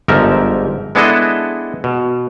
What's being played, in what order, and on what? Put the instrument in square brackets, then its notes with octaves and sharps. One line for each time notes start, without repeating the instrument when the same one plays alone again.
[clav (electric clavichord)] G1 G#2 F3 A#4 E5
G#3 B3 D4 E4 A4 D#5
B2